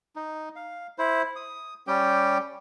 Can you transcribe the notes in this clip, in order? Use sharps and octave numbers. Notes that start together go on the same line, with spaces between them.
D#4
F5
E4 C5
D#6
G3 C#4 G4 G5